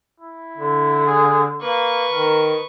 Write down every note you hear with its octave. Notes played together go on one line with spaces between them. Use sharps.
E4
D3
G#4
A#3 B4 C#6
D#3 A#4